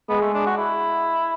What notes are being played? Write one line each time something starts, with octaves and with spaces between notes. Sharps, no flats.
G#3 B3
A3
D4
F#4
E4